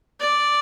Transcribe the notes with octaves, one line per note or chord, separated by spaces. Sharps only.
D5